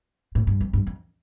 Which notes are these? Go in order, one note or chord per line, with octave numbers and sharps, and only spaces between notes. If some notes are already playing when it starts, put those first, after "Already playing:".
A2
G2
F2
G2
F2